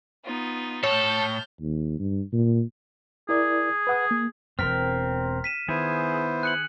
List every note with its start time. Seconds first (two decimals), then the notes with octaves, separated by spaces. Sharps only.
0.23 B3 D#4 F4
0.83 A2 A4 C#5 A5 F6 G6
1.61 D#2
1.99 G2
2.33 A#2
3.29 E4 G#4 A#4 D5
3.87 B4 F#5 D#6
4.11 A#3
4.59 E1 E2 C4 A#4 F6 B6
5.44 B6 D#7 E7
5.69 D#3 B3 E4 G#4 C5
6.43 G#4 F#6 C#7 F#7